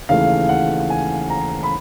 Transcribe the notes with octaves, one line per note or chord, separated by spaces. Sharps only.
D#2 C#3 E3 A3 F5
F#5
G#5
A#5
B5